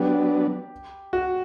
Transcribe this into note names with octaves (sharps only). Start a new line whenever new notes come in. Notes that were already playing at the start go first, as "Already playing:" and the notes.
Already playing: F#3 B3 D4 G4
F#4